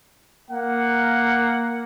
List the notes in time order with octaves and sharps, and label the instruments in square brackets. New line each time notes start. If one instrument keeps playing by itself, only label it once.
[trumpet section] A#3 F#5